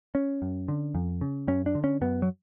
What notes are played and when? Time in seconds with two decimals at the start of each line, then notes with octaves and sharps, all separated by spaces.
0.15 C#4
0.42 F#2
0.68 D3
0.95 F2
1.21 C#3
1.48 F#2 C#4
1.66 D4
1.75 D3
1.84 C#4
2.01 F#2 B3
2.22 F#3